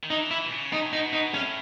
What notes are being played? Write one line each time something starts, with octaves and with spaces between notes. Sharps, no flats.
D#3
E3 D#4
E4
B2
C#3
D#4
A2
B2 D#4
D#4
A2 C#4